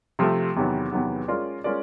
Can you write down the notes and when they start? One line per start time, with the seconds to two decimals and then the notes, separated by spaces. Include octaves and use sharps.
0.19 C3 F3 A3
0.56 E2 C3 D#3 F#3 B3
0.92 E2 C3 D#3 F#3 B3
1.28 G#3 C#4 F4 A#4 D5
1.64 G#3 C#4 F4 A#4 D5